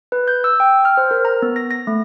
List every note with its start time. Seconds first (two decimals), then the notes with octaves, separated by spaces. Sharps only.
0.12 B4
0.28 G6
0.44 E6
0.60 G5
0.85 F6
0.97 C5
1.11 A#4
1.25 A#5
1.42 B3
1.56 A#6
1.71 A#6
1.87 A3